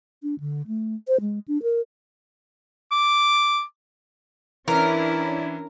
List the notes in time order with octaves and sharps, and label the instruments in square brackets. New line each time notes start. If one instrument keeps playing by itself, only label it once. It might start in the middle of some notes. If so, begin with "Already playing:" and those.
[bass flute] D4
D3
A3
C5
G#3
D4
A#4
[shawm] D6
[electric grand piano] E3 [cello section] C#4 D4 E4 [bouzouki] A#4